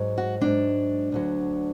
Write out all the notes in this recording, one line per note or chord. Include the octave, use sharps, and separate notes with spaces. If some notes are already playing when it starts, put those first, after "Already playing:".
Already playing: G#2 F#3
F#4
G#2 F#3 D4
D2 D3 F#3